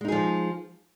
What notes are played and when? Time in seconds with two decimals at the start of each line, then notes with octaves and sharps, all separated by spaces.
0.01 G#3
0.05 D#4
0.08 G#4
0.12 F3